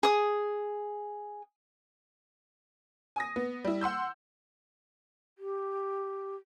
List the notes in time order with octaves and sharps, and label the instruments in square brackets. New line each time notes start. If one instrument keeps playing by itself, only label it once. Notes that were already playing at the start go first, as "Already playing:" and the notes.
[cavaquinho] G#4 D#6
[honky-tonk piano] G#5 D#6 A#6
B3
G3 E4
F#5 C6 E6 G6
[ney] G4